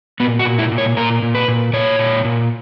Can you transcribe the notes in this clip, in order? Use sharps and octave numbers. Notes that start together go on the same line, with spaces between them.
A#2 B3
F#4
A#2
E4
A#2
C#5
A#2 A#4
A#2
B4
A#2
A#2 C#5
A#2
A#2